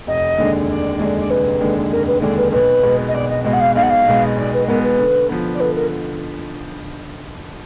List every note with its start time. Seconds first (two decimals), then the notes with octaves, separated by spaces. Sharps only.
0.07 F1 D#5
0.38 D#2 D3 G#3 D4
0.68 F1 D5
0.99 D#2 D3 G#3 D4
1.18 D5
1.30 F1 B4
1.60 D#2 D3 G#3 D4
1.91 F1 A#4
2.07 B4
2.22 D#2 D3 G#3 D4 D5
2.37 B4
2.52 B1 B4
2.83 B2 G#3 B3
3.07 D#5
3.14 B1 D5
3.29 D#5
3.44 B2 G#3 B3 D#5
3.53 F#5
3.60 F5
3.75 B1 F5
3.82 F#5
3.90 F5
4.06 B2 G#3 B3
4.37 B1 D5
4.53 B4
4.68 B2 G#3 B3 A#4
4.83 B4
4.99 D3
5.29 F3 B3
5.54 D5
5.60 D3 B4
5.75 A#4